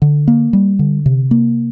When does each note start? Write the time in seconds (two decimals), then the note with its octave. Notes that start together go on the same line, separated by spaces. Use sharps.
0.02 D3
0.28 A#3
0.53 G3
0.79 D3
1.06 C3
1.31 A#3